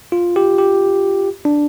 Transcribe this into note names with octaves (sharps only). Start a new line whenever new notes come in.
F4
G4
G4
D4